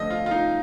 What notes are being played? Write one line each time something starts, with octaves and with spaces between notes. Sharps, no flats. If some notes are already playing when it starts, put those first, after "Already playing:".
Already playing: D3 F3 A3 D#5
F4
F4
D#4